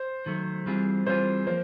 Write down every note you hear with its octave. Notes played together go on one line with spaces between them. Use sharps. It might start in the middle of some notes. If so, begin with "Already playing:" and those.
Already playing: C5
D#3 F#3 A3
E3 G3 C4 F4 G#4
E3 G3 C4 F4 G#4 C5
F3 A#3 C5